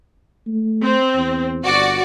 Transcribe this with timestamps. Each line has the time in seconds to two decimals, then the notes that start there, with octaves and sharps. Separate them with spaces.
0.47 A3
0.81 C4
1.15 E2
1.64 G1 F#4 D5